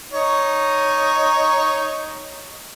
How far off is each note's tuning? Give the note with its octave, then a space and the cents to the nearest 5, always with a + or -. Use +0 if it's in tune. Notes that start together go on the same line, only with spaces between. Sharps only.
D#4 +0 C#5 +0